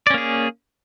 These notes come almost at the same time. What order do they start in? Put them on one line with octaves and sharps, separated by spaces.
D5 C#4 A#3 G#4